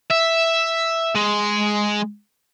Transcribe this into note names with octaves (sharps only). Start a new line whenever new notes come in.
E5
G#3